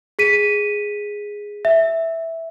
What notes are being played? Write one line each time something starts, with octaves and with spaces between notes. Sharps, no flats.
G#4 B6 D#7
E5